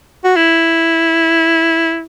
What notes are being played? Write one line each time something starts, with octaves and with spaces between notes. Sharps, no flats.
F#4
E4